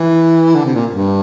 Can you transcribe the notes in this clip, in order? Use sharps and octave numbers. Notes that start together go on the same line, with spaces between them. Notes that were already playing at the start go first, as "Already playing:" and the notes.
Already playing: E3
D3
C3
A#2
G2